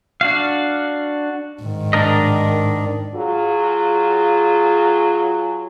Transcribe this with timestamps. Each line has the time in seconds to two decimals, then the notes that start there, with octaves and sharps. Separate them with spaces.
0.21 D4 F#4 F5
1.63 G#2 D#3
1.93 D4 A#4 D#5
3.16 F#3 F4 G#4